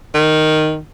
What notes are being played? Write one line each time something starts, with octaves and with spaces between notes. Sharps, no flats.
D#3